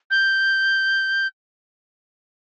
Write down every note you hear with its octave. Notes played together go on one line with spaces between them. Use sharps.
G6